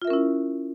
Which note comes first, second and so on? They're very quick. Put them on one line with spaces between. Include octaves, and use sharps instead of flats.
F4 E5 A#4 C#4 E4